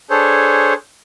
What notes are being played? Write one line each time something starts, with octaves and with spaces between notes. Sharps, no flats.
D4 G#4 A4 C5 C#5